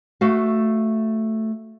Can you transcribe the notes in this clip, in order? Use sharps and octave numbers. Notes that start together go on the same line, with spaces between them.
A3 F#4 F5